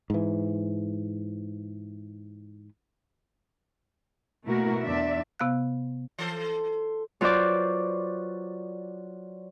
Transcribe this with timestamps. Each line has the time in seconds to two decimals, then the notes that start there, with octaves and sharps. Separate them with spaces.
0.10 G#2 E3
4.46 B2 A3 A#3 E4 F#4 A#4
4.83 E2 D4 D5 E5
5.39 C3 B3 F5 F#6
6.19 E3 A4 C5
7.21 F#3 F4 B4 C5 D5 D6